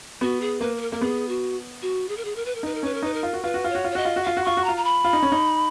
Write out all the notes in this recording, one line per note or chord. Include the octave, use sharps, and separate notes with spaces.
B3 F#4
G#4
A#3 B4
B4
A#4
A#3 A#4
B3 G#4
F#4
F#4
G#4
A#4
G#4
A#4
B4
A#4
D#4 B4
A#4
C#4 B4
A#4
D#4 B4
A#4
F4
F#4
F4 B4
F#4
F4
C#5
F#4
F4
C#5
F#4 D#5
F4
F#4
F4 F5
F#4
F4 C#6
F#4
A#5
F4
A#5
B5
F4
D#4
C#4
D#4